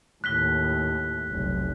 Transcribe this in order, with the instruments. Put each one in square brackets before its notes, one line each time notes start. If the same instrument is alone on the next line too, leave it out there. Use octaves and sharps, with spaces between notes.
[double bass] D#2 A2 [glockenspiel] F#6 B6 G7
[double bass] F1 B1